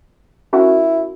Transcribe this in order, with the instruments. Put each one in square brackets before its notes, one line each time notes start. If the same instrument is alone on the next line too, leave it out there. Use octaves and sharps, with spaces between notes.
[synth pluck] C#4 F#4 A#4 [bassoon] E4